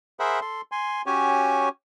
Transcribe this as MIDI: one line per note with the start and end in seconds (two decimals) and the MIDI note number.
0.20 0.40 68
0.20 0.40 70
0.20 0.40 72
0.20 0.40 76
0.20 0.40 78
0.20 0.40 83
0.41 0.61 69
0.41 0.61 84
0.72 1.02 80
0.72 1.02 84
1.06 1.69 61
1.06 1.69 66
1.06 1.69 67
1.06 1.69 73
1.06 1.69 80